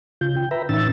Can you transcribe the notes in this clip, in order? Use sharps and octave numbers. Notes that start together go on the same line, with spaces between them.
C#3 F4 G6
G5
B4 E5 A#5 B5
A2 E3 C#4 D#4 E6 A6